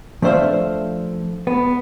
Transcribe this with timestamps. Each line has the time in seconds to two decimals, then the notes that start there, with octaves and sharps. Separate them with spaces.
0.22 F3 A3 D4 C5 E5 F5
1.47 B3